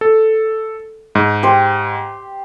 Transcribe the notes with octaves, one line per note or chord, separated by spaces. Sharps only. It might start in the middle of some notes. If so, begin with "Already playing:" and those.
A4
G#2
G4 C5